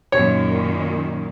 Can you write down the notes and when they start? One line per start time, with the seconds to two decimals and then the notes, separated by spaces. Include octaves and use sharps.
0.12 F#2 A#2 D#3 C#5